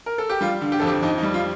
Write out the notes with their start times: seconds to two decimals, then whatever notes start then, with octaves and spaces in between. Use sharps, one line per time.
0.06 A#4
0.18 A4
0.30 G4
0.41 G3 F4
0.61 D3
0.72 G4
0.80 F2 A4
0.87 G4
1.03 F2 D#4
1.18 D#4
1.23 G3
1.34 F4